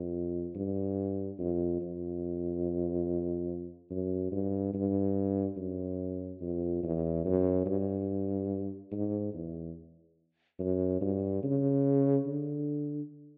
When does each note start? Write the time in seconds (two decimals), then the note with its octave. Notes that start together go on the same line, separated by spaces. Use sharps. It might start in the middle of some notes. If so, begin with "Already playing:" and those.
Already playing: F2
0.55 G2
1.39 F2
1.81 F2
3.90 F#2
4.32 G2
4.74 G2
5.57 F#2
6.41 F2
6.83 E2
7.25 F#2
7.66 G2
8.92 G#2
9.34 E2
10.59 F#2
11.01 G2
11.43 C#3
12.27 D3